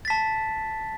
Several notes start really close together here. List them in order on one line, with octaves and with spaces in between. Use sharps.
A6 B6 A5